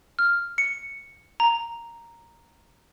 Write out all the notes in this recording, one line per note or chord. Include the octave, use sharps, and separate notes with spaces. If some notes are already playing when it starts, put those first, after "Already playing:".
F6
C#7
A#5